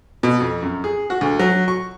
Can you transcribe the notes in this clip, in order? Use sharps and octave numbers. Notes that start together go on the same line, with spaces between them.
B2
F2
F#2
G#4
F#4
D2
F#3
C#6